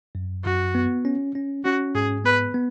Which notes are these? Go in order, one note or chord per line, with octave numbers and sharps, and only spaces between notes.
F#2
F#2 F#4
B3
C#4
C#4
C#4 F#4
G#2 G#4
B3 B4
B3